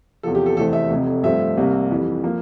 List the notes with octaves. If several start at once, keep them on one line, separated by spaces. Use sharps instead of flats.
E2 C3 F3 A4
G4
A4
F1 E2 E3 A3 C4 A4
E5
F1 F2 C3
G2 F3 A3 C4 E5
C2 C3 G3 A#3
F2 E3 G3
F3 A#3